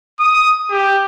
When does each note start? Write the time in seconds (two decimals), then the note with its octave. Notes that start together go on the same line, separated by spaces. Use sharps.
0.19 D#6
0.70 G4